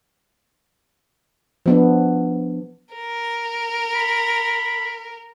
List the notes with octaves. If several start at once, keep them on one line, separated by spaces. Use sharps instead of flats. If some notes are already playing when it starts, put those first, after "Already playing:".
F3 B3 D4
A#4
B5